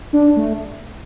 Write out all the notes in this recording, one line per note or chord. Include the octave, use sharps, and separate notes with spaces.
D4
A3